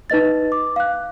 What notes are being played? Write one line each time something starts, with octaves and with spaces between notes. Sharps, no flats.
D#4 B4 D#5 A6
D6
F5 F#6